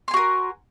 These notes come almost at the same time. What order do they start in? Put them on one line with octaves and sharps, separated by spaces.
C6 G#5 F#4 A#4